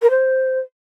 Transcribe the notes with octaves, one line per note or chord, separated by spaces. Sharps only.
A#4
C5